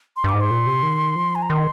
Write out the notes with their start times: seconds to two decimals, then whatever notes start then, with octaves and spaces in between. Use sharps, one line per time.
0.17 C6
0.24 G2
0.29 G#2 D6
0.41 C6
0.51 A#2
0.66 C3
0.83 D#3
1.16 F3
1.35 G#5
1.42 A#5
1.49 D#3 C6